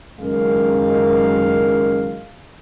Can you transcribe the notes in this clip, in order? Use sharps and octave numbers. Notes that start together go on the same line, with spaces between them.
F#1 F#2 D#3 G#3 A#4 F5